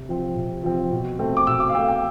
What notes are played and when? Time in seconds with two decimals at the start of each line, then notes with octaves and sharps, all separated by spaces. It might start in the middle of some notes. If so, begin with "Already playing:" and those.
Already playing: C3
0.09 F3 C4
0.36 C3
0.64 F3 C4
0.92 B2
1.19 A3 C4
1.37 D6
1.47 B2 E6
1.60 D6
1.69 F5
1.74 C4 G5
1.79 A3
1.89 G5